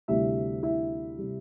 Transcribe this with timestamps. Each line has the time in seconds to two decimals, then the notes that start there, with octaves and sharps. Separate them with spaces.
0.08 D2 C3 G3 E4 E5
0.63 E4 E5
1.18 C3 G3